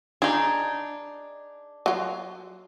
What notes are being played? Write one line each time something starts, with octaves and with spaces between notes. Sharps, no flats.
D4 D#4 G#4
F#3 F4